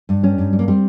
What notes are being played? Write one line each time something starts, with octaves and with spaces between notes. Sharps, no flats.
G2
G3 C#4
G2
G3
A#3
G3 C4